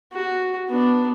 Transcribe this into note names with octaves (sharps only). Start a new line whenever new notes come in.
F#4
B3 D4